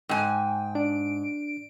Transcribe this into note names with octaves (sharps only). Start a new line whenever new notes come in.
G#2 G5 G#5
D4 D7